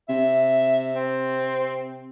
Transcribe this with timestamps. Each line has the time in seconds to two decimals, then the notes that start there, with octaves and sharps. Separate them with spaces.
0.09 C3 E5
0.94 C4